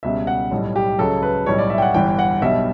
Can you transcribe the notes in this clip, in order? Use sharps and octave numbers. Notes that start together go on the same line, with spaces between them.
C#2 B2 G3 E5
F#5
B1 A2 G3
G4
C#2 C#3 F#3 A4
B4
B1 A2 G3 C#5
D5
E5
G5
F#5
G1 G2 E3 G3 G5
F#5
B1 B2 G3 E5